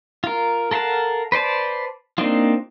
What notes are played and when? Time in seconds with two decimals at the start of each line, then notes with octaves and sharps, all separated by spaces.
0.24 F4 A#4
0.71 A4 A#4 F5 F#5 A5
1.32 B4 C5 D5 A5
2.18 A#3 C4 D4 D#4 F4